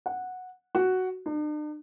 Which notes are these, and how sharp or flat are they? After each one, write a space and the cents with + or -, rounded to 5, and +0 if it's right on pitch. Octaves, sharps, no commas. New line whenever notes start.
F#5 -10
F#4 +5
D4 +45